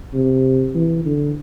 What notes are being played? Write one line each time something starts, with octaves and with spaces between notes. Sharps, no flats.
C3
E3
D3